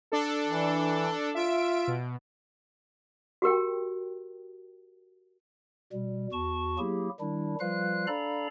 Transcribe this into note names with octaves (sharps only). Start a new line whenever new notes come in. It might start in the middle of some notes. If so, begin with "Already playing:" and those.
D4 A4
E3
F4 E5 D7
B2
F#4 G4 A#4 G5
B2 G3
E2 F#4 A5 C#6
F#3 A#3 E4 G4 G#4
D#3 G3 D4 E4
F3 G3 F4 B4 F5 F#6
D4 A4 D5 F5 A#5 B5